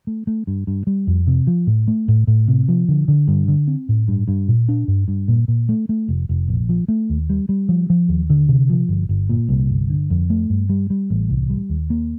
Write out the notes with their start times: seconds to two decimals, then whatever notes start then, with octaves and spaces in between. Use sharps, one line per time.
0.07 A3
0.27 A3
0.47 G2
0.67 G2
0.87 G3
1.07 F2
1.27 C3
1.47 F3
1.67 A2
1.88 A3
2.08 A2
2.27 A2
2.48 C3
2.68 F3
2.88 D3
3.08 D3
3.28 G2
3.48 D3
3.67 C4
3.89 A2
4.08 G2
4.28 G2
4.48 A#2
4.69 D4
4.88 G2
5.08 G2
5.28 A#2
5.48 A#2
5.69 A3
5.89 A3
6.08 F1
6.29 F1
6.48 A#1
6.69 F3
6.88 A3
7.09 D#2
7.30 G3
7.49 G3
7.69 F3
7.90 F3
8.09 D#2
8.30 D3
8.49 C3
8.70 F3
8.89 G1
9.09 G1
9.29 A#2
9.49 C2
9.70 G1
9.90 D3
10.10 F2
10.30 A3
10.50 G2
10.69 G3
10.90 G3
11.10 A1
11.29 C2
11.49 G3
11.69 D#2
11.90 A#3